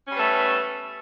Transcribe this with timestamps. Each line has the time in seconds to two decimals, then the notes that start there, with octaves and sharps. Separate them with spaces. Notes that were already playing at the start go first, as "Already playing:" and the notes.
0.08 C#4
0.12 G3
0.16 B3
0.19 A3